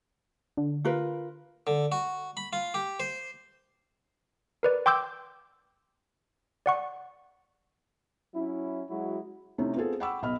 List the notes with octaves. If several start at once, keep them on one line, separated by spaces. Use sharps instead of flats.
D3
F4 A#4 B4
D3
F#4
B5
F4
G4
C5
A#4 B4 D5
G5 C6 D6 E6 G6
D5 F#5 C#6
F#3 C#4 E4
F#3 G#3 E4 F#4
C3 A3 C#4 D#4 E4
B3 C4 F4 G#4 A4
F#5 G5 B5 C#6 D6 E6
B1 B2 D#5 B5 F6